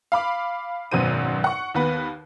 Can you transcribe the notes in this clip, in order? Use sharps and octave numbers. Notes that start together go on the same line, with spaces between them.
F5 B5 D6
G#1 F#2 B2 F#4 C5 D#7
F#5 C#6
D#2 B3 B4